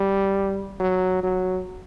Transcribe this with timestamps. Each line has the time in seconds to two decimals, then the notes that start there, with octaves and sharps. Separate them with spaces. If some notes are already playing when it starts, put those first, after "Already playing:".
Already playing: G3
0.80 F#3
1.23 F#3